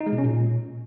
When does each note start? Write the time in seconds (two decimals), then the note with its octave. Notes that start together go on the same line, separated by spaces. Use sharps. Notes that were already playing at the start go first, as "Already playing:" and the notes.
0.01 D#4
0.06 G#3
0.12 B2
0.18 C#4
0.24 A#2